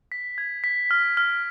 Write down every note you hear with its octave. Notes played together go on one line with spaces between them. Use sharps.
B6
G#6
B6
F6
F6